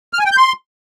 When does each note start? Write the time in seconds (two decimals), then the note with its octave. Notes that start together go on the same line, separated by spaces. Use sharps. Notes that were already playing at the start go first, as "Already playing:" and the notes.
0.13 F6
0.19 G#5
0.25 G5
0.31 G6
0.37 C6